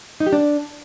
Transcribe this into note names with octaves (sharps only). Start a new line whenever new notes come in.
D#4
G4
D4